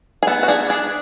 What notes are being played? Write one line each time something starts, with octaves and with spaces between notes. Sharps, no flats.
G#4
B3 A4
F#4
D4 G#4
D4 G#4